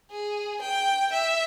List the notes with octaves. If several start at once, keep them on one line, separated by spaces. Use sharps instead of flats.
G#4
G5
E5